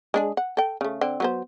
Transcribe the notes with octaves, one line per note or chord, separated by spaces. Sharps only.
G#3 D4 G#4
F#5
A4 G5
C#3 A3
D3 C4
F#3 B3 C5